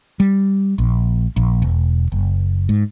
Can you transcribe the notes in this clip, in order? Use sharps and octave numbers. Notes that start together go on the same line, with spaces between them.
G3
A#1
A#1
E1
F#1
G#2